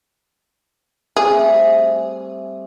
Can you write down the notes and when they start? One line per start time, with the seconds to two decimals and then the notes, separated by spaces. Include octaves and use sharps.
1.16 G3 A3 C4 G#4